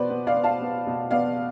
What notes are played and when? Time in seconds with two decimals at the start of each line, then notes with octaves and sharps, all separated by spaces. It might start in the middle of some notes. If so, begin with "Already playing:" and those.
Already playing: B2 B3 B4 C5 D5
0.10 B3
0.27 D5 F5
0.36 B3
0.44 F5 A5
0.62 B3
0.87 B2
1.11 B3 D5 F5